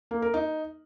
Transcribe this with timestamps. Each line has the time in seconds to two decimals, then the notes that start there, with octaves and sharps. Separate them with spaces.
0.11 A#3
0.22 A#4
0.34 D#4